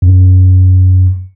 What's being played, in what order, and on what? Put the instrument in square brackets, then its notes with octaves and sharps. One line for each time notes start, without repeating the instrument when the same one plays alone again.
[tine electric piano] F#2